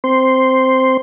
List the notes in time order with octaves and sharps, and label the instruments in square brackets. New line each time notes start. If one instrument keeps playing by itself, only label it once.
[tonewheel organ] C4 C6